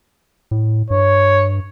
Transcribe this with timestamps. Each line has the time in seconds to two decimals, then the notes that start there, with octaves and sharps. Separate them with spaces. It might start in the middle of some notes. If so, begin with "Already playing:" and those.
0.51 A2
0.91 G2 C#5